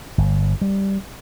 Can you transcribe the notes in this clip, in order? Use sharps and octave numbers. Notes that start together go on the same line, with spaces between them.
G1
G3